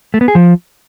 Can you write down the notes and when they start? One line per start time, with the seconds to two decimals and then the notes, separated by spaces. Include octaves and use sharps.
0.14 A3
0.21 B3
0.28 G#4
0.35 F3